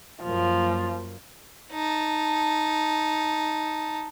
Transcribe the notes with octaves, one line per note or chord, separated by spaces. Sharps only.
F#2 F3 A#3
D#4 A5